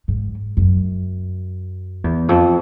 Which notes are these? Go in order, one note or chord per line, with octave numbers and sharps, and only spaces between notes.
G#2
F#2
E2
F2